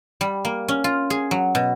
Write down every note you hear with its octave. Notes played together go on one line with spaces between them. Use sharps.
G3
A#3
C#4
F4
G#4
F#3
B2